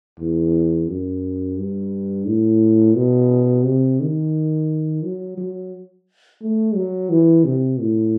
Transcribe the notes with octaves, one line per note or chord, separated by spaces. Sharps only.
E2
F#2
G2
A2
B2
C3
D#3
F#3
F#3
A3
F#3
E3
C3
A2